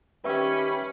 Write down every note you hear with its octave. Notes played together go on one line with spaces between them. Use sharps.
D#3 G3 C#4 G4 B4 E5 B5 C#6